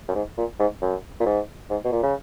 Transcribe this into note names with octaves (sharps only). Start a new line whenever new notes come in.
F#2
G#2
A#2
G#2
F#2
A#2
G#2
G#2
B2
A#2
C#3